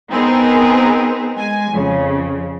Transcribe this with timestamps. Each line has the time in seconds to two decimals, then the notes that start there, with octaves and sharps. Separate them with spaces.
0.11 B3 C4 D#4 G#4 A#4 B4
1.36 G#3 G#5
1.72 F2 C#3